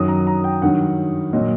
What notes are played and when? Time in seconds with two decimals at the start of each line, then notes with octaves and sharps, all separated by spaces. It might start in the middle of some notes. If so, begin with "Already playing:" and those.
Already playing: F#2 D#3 F#3 D#6
0.08 A#5
0.27 A#5
0.44 G5
0.62 G2 D#3 F#3 F#5
1.33 A#2 F#3 D#5